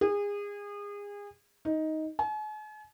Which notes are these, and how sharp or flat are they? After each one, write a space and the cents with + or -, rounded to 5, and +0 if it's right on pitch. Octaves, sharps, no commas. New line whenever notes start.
G#4 -30
D#4 +10
G#5 +45